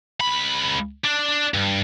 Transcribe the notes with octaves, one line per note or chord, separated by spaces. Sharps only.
C#2 B5
D4
G2